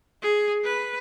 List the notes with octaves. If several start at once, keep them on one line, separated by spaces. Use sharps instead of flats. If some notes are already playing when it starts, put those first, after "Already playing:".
G#4
B4